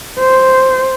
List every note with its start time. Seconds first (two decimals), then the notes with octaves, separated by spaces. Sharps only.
0.20 C5